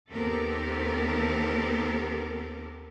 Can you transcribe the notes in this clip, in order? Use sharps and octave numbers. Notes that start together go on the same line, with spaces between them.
D#2 B3 C4 G4 A4 A#4